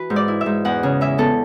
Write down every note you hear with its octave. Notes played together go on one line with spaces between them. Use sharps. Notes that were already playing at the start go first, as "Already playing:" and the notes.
Already playing: E3 F#4 B4
G#2
D5
E4
E5
G#2
E2 F#5
C#3
E3 E5
B3 A4